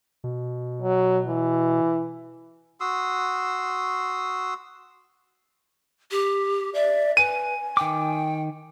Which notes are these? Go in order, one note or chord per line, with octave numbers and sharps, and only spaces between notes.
B2
F#3
E3
F#4 C6 D#6 E6
G4
D5 E5
B4 G#5 D#7
D#3 G5 D6